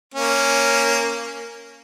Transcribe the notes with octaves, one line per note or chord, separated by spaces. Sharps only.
A#3 C#4